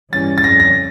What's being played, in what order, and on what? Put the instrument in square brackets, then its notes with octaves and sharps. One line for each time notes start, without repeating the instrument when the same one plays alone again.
[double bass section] G2 E3 G3 C#4 [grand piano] A6
[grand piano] A6
[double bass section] F2 C#3 G3 C#4 [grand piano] A#6
[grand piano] A#6